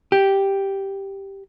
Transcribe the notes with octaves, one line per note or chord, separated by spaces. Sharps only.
G4